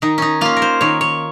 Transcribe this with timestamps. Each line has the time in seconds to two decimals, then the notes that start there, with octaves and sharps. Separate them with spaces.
0.02 D#3 D#4
0.18 C#4 D#4
0.41 A#3 C#4 F4
0.57 A#4
0.62 C5
0.81 D#3 C#5
1.01 C#5